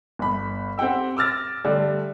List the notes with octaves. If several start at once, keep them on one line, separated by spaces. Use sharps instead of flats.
G1 B5
C4 G4 F#5 G5 E6
D6 E6 F6 A6 A#6
D3 G3 A3